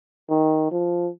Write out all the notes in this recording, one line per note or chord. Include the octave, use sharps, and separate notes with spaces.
D#3
F3